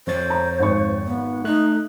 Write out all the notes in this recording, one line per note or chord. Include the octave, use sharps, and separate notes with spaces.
F2 C5 C#5 A6
A#5
G#1 C#6
B3
A3 D#4 F#6